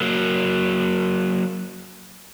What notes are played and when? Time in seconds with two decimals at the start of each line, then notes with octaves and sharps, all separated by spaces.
0.01 F#3 A#3